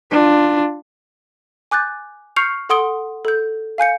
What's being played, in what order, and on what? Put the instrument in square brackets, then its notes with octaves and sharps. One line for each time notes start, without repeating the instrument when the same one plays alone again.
[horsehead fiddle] D4 F4
[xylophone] G#5 D6 F#6 G6 A6
C#6 F6 G6 C7 C#7 F7
A4 F#5 C6 D#6 D7 G7
A4 G6
F5 G#5 G6 C#7